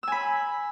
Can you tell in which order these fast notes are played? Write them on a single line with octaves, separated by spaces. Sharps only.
E6 G#5 B5